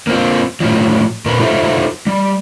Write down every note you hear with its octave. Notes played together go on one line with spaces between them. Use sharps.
A#3 C4 F4
A2 F3 F#3
A#2 A#4 B4
F#3 D#4 F4 A4 C5 E5
G3